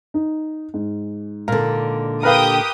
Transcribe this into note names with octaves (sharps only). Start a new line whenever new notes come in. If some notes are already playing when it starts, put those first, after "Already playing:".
D#4
G#2
A#2 D3 A#4
G4 A#4 B4 F5 G5 D#6